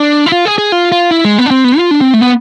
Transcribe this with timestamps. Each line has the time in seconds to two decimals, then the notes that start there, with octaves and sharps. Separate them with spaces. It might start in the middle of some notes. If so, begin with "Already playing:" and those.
Already playing: D4
0.26 E4
0.32 F4
0.45 G#4
0.58 G#4
0.72 F4
0.92 F4
1.11 E4
1.25 G#3
1.38 B3
1.46 D4
1.51 C4
1.64 B3
1.78 F4
1.91 D4
2.01 C4
2.14 A3
2.21 B3